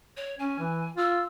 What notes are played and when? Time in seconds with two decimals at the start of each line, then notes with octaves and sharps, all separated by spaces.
0.17 C#5
0.39 C#4 G#5
0.59 E3
0.97 F4 E6